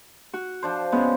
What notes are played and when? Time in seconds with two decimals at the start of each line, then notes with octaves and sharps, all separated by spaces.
0.34 F#4
0.63 F3 D4 C5
0.92 G#3 B3 C#4